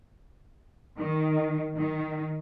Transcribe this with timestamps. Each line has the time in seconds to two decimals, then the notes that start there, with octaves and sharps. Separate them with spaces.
1.01 D#3
1.77 D#3